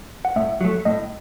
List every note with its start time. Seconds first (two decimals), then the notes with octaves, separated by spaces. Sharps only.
0.25 F#5
0.36 A2 E5
0.61 F#3 A3
0.85 A2 D#5